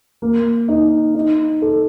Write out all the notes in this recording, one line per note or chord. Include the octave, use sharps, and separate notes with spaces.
A#3
D#4
D#4
A4